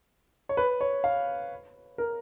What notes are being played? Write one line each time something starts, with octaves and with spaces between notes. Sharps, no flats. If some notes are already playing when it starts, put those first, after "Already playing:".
C#5
B4
C#5
F5
A#4